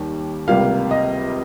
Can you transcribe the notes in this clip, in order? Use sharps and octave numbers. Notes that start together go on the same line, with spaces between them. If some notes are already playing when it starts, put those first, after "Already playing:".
Already playing: D#2 D#3 G3
C#2 C3 G3 A#3 F5
D#5